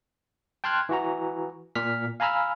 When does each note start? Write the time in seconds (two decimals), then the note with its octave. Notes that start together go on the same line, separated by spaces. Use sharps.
0.64 G5 A5 C6 F6 F#6 G#6
0.89 E3 F#4 A#5
1.75 A#2 F6 B6
2.20 F5 G#5 A#5 B5 E6 F6